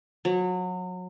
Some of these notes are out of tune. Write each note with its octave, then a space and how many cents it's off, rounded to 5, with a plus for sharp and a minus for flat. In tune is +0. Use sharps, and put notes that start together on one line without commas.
F#3 -25